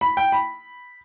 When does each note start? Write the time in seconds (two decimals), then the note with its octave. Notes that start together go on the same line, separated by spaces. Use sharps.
0.01 B5
0.17 G5
0.32 B5